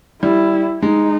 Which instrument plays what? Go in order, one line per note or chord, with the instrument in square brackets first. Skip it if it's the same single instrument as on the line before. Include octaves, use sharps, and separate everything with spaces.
[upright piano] G3 [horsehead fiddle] E4
[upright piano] G#3 [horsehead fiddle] D#4